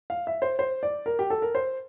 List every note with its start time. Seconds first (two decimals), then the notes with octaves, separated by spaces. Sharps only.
0.10 F5
0.27 E5
0.42 C5
0.59 C5
0.83 D5
1.06 A#4
1.19 G4
1.30 A4
1.42 A#4
1.55 C5